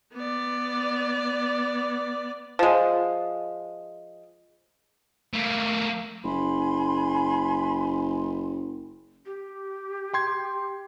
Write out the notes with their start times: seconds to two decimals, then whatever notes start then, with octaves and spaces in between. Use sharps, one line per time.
0.14 B3 D5
2.59 F3 G#3
5.33 A3 A#3
6.24 F#1 G#5 B5 C6
9.26 G4
10.13 G5 C6 G#6